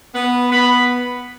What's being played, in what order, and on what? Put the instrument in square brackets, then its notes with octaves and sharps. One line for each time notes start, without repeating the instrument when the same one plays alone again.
[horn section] B3
[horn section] B3 [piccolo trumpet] B5